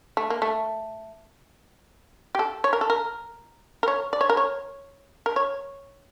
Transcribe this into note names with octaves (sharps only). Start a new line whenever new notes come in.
A3
A#3
A3
G4
A4
C#5
A#4
A4
A#4
A#4
C#5
D5
C#5
A#4
C#5
A#4
C#5